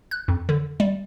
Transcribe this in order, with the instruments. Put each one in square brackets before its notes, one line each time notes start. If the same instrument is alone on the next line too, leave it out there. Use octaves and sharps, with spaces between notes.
[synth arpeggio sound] F#6
F2
D3
G3